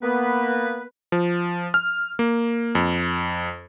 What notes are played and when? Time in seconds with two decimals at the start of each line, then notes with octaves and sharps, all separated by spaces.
0.02 A#3 B3 B4
1.12 F3
1.74 F6
2.19 A#3
2.75 F2